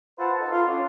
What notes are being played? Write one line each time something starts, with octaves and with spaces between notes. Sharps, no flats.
F4 B4 C5 F#5 A5
D#4 A4
F4
C#4 D4